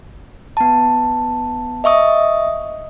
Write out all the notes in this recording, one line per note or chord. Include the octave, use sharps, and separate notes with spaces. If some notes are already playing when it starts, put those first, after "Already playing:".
B3 A5
D#5 E5 C#6 D#6